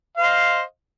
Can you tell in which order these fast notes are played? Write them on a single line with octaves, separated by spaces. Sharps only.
F5 C5 D#5